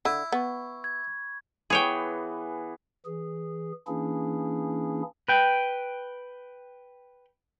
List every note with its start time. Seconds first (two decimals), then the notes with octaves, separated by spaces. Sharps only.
0.05 D3 E4
0.32 B3 B5 C#6
0.84 G#6
1.70 E3 B3 G#4 C#5 G5
3.05 E3 G#4
3.87 E3 A#3 C#4 D4 E4 G#4
5.28 B4 G5